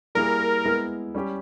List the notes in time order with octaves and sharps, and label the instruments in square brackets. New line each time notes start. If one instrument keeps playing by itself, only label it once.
[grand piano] G3 A#3 E4 G#4 [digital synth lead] A#4
[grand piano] G#3 B3 E4
G3 C#4 G4